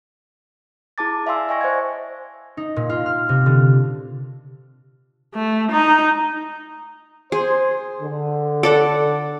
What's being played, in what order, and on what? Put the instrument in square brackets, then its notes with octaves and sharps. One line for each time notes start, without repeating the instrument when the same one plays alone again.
[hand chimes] E4 G#4 A5 D6 A6
D5 E5 F5 G#5 C6 E6
D#5 E5 G5 G#5 C#6 A#6
C5 D5 E5 F5 G#6
[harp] D#4
A#2
F4
F6
C3
D3
[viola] A3
D#4
[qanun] G#4 [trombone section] C5
[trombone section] D3
[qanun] A4 D5 F#5